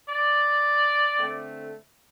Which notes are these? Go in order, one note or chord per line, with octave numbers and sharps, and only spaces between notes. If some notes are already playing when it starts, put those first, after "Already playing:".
D5
D3 A3 C4